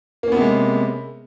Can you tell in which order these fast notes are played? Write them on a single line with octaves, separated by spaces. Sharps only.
A#3 C#4 B3 C3 G#3